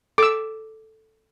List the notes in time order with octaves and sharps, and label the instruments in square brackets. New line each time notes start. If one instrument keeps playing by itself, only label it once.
[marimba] A4 [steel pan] D6 E6